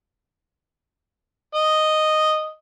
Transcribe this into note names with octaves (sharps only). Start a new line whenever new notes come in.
D#5